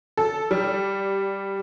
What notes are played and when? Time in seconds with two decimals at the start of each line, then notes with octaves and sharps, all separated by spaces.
0.17 A4
0.51 G3